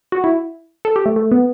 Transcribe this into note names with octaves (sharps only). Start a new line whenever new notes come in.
F#4
E4
A4
G4
A3
A3
B3